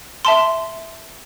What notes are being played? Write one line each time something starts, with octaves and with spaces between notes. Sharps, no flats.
E5 A5 C6